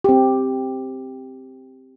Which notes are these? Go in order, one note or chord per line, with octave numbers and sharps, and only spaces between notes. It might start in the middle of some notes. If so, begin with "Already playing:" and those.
C4 G4